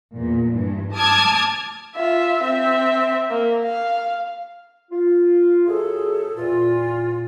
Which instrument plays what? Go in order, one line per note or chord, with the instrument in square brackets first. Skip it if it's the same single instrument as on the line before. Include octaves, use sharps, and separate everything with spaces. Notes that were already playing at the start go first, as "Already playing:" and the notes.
[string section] E2 A#2
G2 E3
A5 D6 D#6 F6 G#6
[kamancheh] F4 E5
C4 E5
A#3
F5
[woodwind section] F4
[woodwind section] F#2 G#4 [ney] A4
[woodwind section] E2 A#2 [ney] F4